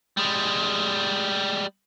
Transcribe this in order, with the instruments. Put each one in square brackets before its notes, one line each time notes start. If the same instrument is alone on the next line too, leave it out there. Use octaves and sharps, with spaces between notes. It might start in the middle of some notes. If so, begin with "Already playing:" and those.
[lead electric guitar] G3 G#3